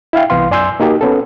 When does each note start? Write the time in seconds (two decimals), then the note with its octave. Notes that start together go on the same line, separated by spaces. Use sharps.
0.13 E4 E5 F5 G5
0.30 C2 E3 B3 F5 C6
0.51 F#2 D5 G#5 C6 E6 G6
0.80 A#3 D#4 F#4 G4 A#4
1.01 B3 C#4 A4